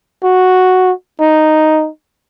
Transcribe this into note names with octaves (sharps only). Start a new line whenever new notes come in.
F#4
D#4